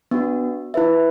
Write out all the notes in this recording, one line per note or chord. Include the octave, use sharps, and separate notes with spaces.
B3 D4 F#4
E4 B4 E5